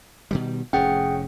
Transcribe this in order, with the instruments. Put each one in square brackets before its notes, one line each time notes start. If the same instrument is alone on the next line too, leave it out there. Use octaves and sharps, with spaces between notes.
[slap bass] B2 D#3 G3
[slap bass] F1 A2 C#4 [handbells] G#4 F#5 G5